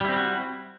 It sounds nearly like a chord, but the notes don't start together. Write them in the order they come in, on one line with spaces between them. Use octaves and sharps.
G3 E4 C4 G4 F#4